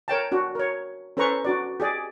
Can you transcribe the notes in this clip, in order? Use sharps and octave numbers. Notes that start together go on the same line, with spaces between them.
A#4 C#5 G5 A5
D4 F#4
A#4 C#5
C#4 A4 B4 C5 A#5 C#6
D4 F#4 D5
G4 G#4 D5